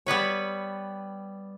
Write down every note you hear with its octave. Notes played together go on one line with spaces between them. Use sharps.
G3 B3 B4 C#5